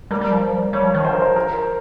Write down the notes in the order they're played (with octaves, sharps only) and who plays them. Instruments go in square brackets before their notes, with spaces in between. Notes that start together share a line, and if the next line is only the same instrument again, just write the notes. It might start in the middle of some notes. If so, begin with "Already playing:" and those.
[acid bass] G3 [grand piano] A#4
[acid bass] G3
F3
G3
[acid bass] G3 [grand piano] C#5
[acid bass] F3
D#3
[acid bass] F3 [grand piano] C5
[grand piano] A#4
C5
A#4